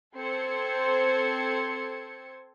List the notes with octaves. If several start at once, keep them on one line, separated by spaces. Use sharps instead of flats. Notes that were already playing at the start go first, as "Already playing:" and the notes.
C4 A4 C5 C6 G#6 C#7